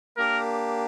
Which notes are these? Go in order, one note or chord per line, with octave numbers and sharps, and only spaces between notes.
A#3 D4 G4 A#4